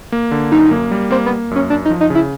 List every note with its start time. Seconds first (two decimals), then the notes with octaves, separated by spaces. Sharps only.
0.12 A#3
0.31 D3
0.52 F#2 D#4
0.71 A#3
0.91 G3
1.11 A#3 C4
1.26 B3
1.31 A#3
1.51 F#2 C#4
1.70 F#2 D4
1.85 D#4
1.90 F3
2.01 D#4
2.10 C#3 E4